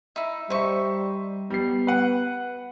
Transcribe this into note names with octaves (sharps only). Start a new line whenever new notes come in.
D#4 E4
G3 D#4 C5 E5 C#6
G3 B3 C7
B4 F#5